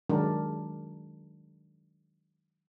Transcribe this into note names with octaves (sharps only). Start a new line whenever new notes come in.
D#3 F#3 G#3 D4 A#4